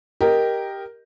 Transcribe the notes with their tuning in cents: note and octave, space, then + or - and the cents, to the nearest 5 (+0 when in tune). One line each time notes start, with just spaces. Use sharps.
G4 +0 A#4 +0 D#5 -5